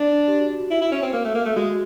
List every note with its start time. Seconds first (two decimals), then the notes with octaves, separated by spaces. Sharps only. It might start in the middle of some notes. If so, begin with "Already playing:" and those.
Already playing: D4
0.28 G4
0.39 F#4
0.49 F#4
0.60 F#4
0.71 E4
0.81 E4
0.92 C#4
1.02 C4
1.13 A#3
1.24 A3
1.35 A#3
1.45 A3
1.56 G#3 F#4